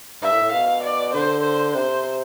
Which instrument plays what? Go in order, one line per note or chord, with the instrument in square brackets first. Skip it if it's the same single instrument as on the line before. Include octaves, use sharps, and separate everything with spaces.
[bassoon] G2 [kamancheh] E5
[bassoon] A2
A2
[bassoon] B2 [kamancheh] F5
[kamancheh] D5
[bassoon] D3 [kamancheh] C5
[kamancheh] C5
[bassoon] C3 [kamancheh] C5